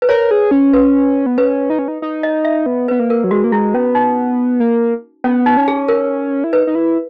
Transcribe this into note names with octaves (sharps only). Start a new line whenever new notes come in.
B4
A#4 C#5
G#4
C#4
B4
B3
C#4 B4
D#4
C#4
D#4
D#4
D#5
E5
B3
B3 B4
A#3
A#4
F#3
G#3 F#4
A#3
G#3 E4
B3 C#4
D#4
A#3
B3 C#4
D#4
C#4
G#4
A#4
E4
D#4 B4
D#4
E4